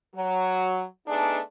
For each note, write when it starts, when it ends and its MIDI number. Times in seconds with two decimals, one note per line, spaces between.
0.16 0.84 54
1.07 1.40 57
1.07 1.40 59
1.07 1.40 62
1.07 1.40 63
1.07 1.40 68